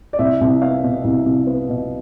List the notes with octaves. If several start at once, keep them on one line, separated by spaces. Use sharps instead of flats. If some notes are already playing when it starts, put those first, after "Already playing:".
D5
C2 E5
C2
B3 F5
B2
C2
C2
B3
B2